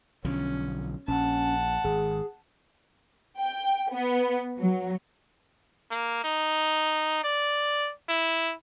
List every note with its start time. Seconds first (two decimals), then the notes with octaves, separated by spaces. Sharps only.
0.25 B1 D3 F3 C#4
1.08 A#1 C#4 F#5 A5
1.84 G#1 G#4
3.39 G5
3.91 B3
4.59 F#3
5.91 A#3
6.24 D#4
7.24 D5
8.09 E4